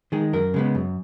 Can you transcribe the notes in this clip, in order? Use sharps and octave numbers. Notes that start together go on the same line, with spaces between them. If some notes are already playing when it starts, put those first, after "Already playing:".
D#3 G#3 G#4
F#2 A#4
C#3 G#3 B3
F#2